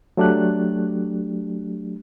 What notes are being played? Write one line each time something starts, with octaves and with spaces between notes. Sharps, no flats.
F#3 A3 D4 G4 F#6